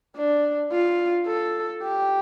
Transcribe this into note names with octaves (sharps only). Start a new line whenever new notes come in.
D4
F4
A4
G4